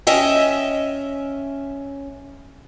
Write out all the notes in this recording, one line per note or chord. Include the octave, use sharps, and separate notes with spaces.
C#4 D#5 E5 G5